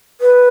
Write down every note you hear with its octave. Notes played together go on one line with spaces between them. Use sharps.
B4